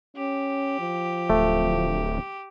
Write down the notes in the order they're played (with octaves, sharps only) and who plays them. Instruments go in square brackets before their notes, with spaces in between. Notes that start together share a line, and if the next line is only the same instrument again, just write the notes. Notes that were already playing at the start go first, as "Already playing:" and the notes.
[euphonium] C#4 [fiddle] G4
[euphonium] F3
[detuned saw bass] D1 [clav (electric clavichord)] A3